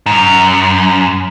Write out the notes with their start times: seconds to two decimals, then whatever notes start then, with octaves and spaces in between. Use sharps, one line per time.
0.06 G#2
0.11 F#2